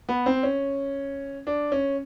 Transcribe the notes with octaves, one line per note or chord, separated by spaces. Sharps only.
B3
C4
C#4
D4
C#4